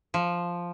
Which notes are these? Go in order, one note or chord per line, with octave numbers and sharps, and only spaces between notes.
F3